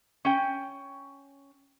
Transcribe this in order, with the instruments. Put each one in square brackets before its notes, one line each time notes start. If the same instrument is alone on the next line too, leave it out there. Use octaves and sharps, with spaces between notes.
[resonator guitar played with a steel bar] C#4 G5